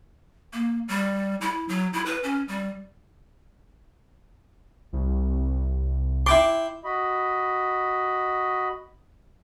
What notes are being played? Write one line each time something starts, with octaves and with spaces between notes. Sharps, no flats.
A#3
G3
E4
F#3
E4
B4
C#4
G3
C2
E4 G5 C6 D6
F#4 D#5 B5